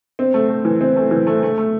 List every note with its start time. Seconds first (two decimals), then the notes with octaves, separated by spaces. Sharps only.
0.19 C4
0.34 A3
0.49 A3
0.65 E3
0.81 C4
0.96 A3
1.11 E3
1.27 A3
1.43 A3
1.58 A3